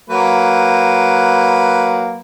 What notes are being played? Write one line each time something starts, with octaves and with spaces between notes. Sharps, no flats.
F#3 A#3 B4